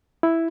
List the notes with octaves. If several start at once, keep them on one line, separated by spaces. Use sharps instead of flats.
E4